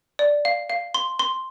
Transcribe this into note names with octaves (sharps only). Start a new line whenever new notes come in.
D5
F5
F5
C6
C6